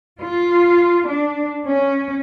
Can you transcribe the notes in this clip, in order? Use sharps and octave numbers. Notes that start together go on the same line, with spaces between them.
F4
D4
C#4